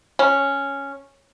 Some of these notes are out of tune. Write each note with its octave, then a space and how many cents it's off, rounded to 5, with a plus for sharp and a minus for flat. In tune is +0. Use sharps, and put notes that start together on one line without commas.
C#4 +0